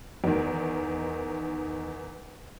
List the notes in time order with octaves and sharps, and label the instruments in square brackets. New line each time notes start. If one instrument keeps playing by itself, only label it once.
[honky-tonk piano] E2 D#3